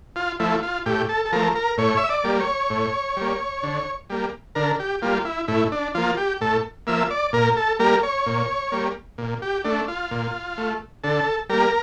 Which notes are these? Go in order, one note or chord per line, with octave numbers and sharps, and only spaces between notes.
F4
F3 A3 E4
F4
A2 G4
A4
A4
F3 A3 A#4
A#4
A2 C#5
E5
D5
G3 A#3
C#5
A2
G3 A#3
D3
G3 A#3
D3 A#4
G4
G3 A#3 F4
E4
A2 E4
D4
F3 A#3 F4
G4
A2 A4
F3 A#3 E5
D5
A#2 A#4
A4
G3 A#3 A#4
C#5
A#2
G3 A#3
A#2
G4
A3 D4
F4
A#2
A3
D3 A4
G3 A#3 A#4